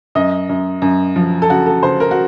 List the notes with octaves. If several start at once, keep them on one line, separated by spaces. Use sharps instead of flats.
F#2 D#5
F#2
F#2
F3
A4
C#3 F#4
A4
C#3 C5
A#4
F#4